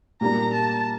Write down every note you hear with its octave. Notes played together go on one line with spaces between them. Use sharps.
A#2 G3 A#3 D4 A#5
A5